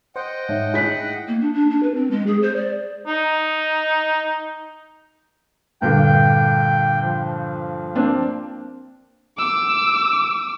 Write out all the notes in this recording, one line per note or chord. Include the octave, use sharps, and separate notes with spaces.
C5 D#5 F#5 G5
G#2 D#4 C#5 E5
E4 G#4 F#6 B6
A#3
D4
D4
D4
B4
C4
G#3
G#4
C5
D5
D#4
G2 A#2 D3 G5 G6
F3
A#3 C4 D4
D6 E6